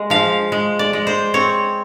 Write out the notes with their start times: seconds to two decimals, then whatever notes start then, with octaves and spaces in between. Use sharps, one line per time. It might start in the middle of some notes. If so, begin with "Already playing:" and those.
Already playing: G#3
0.10 F3 F5
0.52 G#3
0.79 D5
0.93 G#3
1.07 C5
1.34 C4 C#5